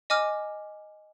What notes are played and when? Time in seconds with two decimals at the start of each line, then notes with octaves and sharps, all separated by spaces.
0.10 D#5 G#5 D6 F6